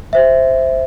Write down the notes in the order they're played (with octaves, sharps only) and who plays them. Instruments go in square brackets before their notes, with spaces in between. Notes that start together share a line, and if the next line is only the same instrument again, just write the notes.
[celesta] C5 E5